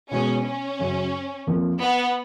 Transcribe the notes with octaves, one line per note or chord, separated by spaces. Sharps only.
B2 G#3 B3 C#4
C#4
F#2 C#3 F#3
F2 F3 A#3
B3